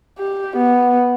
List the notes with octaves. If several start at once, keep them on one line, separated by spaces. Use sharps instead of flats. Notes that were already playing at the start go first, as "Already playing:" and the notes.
G4
B3